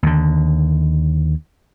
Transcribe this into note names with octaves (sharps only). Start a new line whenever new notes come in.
D#2 D3